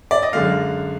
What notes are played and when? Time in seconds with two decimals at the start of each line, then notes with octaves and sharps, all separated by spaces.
0.11 D5
0.22 D#5
0.33 F#2 D3 G#3 F5